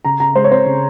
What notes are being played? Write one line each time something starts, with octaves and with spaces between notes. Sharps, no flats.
C#3 A#5
C#3 A#5
G#3 C5
C#5
C4 C5
C#3